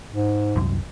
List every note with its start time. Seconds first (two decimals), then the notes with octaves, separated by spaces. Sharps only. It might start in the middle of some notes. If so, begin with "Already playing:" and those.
0.10 G#2
0.55 C2 F#2